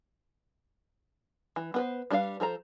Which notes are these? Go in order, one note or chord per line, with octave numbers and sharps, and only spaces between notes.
E3
B3 B4 C5
G3 D4 B4 D#5 F5
F3 A4 C5 A#5